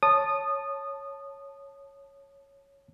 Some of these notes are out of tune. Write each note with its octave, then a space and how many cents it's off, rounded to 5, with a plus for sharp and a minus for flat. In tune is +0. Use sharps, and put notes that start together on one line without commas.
C#5 +0 A5 +0 D#6 -20